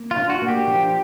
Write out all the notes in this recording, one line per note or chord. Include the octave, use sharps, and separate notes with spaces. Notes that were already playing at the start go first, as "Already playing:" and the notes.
Already playing: A#3
F4
D4
F#4
A#3
G4
F3